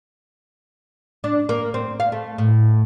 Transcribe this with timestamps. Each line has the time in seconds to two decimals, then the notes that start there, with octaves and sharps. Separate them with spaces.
1.24 D4
1.49 A#3
1.74 C4
2.00 F5
2.12 A3
2.38 A2